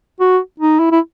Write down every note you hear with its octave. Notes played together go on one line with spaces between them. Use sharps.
F#4
D#4
E4
E4